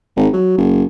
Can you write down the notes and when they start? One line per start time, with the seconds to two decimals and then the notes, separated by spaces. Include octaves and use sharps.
0.16 G#1
0.33 F#3
0.58 F#1